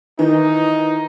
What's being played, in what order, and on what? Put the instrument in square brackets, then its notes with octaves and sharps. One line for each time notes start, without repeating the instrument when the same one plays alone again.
[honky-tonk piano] D#3 E3 [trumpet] D#4